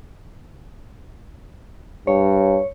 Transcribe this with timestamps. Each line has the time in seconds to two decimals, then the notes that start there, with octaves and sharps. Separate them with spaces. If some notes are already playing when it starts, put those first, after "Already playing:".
2.07 G2 C#5